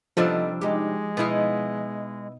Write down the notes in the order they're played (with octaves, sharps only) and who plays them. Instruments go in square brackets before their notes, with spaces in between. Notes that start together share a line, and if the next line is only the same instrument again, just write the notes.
[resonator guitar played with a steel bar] C3 G3 D4 [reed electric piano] F3 E6 [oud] B3 D#4 A4
[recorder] G#3 [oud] D#4 G4
[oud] B2 D#4 F5 [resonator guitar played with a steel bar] B3 E4